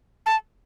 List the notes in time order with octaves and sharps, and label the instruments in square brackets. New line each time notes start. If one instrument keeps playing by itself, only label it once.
[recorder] A5